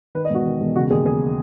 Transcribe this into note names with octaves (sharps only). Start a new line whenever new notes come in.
D#3 B4
D#5
E1 F#4
D#3
E1
C#3 F#4
D#2 G#4
C#3 G#4